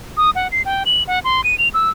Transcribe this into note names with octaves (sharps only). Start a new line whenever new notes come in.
D#6
F#5
C7
G5
F#7
F#5
C6
D#7
F7
E6